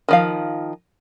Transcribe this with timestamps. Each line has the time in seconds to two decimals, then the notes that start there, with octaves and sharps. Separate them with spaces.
0.09 D#3 F3 F5